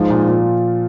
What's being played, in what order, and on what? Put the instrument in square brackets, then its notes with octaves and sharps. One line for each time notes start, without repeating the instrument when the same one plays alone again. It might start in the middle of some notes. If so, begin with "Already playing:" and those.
Already playing: [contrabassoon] G#2 [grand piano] F3
[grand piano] A#2
A#2